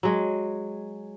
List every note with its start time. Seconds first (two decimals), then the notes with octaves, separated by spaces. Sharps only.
0.03 F#3 G#3